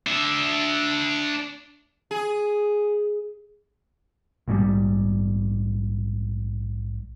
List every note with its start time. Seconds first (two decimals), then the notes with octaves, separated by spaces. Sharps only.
0.07 D4 E5
2.11 G#4
4.48 A#1 G#2 D#3 G3